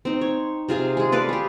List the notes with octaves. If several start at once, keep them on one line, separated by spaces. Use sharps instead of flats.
C4 D#4
C#5
C3 F4 G#4 F5
G#3 G#4
A4 B4 D5 F5
G4 G#4